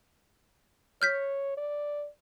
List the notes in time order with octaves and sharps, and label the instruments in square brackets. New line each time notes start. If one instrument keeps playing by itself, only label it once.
[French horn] C#5 [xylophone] F6 G6 B6
[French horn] D5